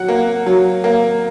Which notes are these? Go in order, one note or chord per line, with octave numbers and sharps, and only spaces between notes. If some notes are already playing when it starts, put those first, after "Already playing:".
Already playing: F#3 F#5
A#3
F#3
A#3